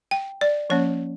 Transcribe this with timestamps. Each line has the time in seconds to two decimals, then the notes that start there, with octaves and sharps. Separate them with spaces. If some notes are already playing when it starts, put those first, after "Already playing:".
0.11 G5
0.41 D5
0.70 F3 A#3 C#4 C#5